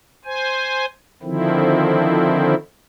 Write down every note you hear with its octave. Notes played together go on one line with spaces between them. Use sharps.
C5 G#5
D3 D#3 F3 C4 E4